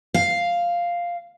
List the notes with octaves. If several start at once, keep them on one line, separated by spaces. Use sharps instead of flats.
F5